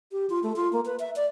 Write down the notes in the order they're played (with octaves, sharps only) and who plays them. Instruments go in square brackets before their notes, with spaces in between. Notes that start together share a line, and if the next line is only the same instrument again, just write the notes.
[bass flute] G4
F4
A3
F4
A#3
B4
E5
D5